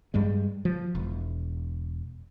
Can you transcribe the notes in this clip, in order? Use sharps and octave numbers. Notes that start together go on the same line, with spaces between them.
G2 G3 G#3
F3
E1